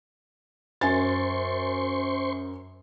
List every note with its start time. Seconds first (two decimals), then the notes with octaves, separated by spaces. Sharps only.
0.81 F#2 C5 G#5 C6 C#6 A6